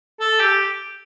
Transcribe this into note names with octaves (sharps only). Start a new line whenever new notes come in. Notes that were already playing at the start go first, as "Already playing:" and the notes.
A4
G4